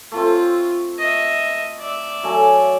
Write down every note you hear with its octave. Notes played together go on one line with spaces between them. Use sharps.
A3 C4 F4
D#5 E5
D5 E5
F#3 A3 G#5